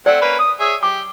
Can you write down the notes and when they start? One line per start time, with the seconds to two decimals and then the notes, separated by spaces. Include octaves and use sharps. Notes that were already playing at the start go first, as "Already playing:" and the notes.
0.06 A3 C4 D5 F#5
0.22 A#3 C#4 B4
0.39 D#6
0.60 G#4 C#5 E5
0.83 G4 D6